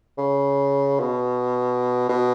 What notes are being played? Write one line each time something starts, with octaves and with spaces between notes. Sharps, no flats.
C#3
B2
B2